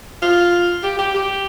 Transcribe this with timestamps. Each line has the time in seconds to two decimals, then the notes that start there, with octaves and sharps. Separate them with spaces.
0.22 F4
0.83 G4
0.99 G4
1.14 G4